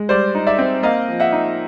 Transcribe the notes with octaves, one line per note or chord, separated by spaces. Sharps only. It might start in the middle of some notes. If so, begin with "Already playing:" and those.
Already playing: G#3
G3 C5 D5
D#4
D5 E5
C4
A#3 D#5 F5
F3
E5 F#5
D#4